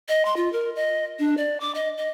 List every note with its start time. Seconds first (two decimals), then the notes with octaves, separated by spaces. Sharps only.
0.09 D#5
0.25 C6
0.37 F4
0.53 A#4
0.76 D#5
1.19 D4
1.37 D5
1.60 D6
1.75 D#5
1.98 D#5